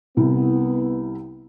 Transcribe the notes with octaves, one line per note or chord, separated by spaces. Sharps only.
C2 C3 B3 E4